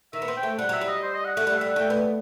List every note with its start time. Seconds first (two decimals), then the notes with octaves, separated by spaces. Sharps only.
0.13 D#3 E5
0.22 B3
0.28 C4
0.36 G5
0.43 A3
0.58 G3 F#5
0.69 F#3 E5
0.81 G3
0.88 D#5
1.02 C5
1.14 D#5
1.25 F#5
1.35 A3 F#5
1.47 G3 F#5
1.57 E5
1.61 G3
1.69 F#5
1.76 A3 G5
1.90 B3